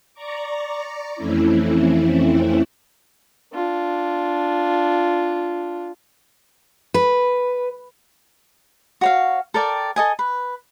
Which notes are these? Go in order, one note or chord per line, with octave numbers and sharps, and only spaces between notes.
D5 A#5 C#6 D6
F2 E3 A3 C4 C#4 E4
D4 F4
B4
F#4 C#5 F5
A4 A#4 D5 G5
A4 D#5 G#5
B4